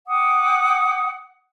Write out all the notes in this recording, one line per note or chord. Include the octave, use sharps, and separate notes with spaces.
F#5 G5 D6 D#6